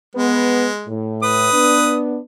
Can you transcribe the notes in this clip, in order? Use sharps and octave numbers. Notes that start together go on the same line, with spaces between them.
G#3 B3
A2
B4 D#6
B3 D4